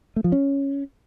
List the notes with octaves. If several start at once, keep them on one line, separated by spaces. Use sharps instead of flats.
A3
F3
C#4